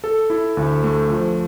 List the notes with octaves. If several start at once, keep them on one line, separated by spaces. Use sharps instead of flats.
A4
E4
D2
A3
F3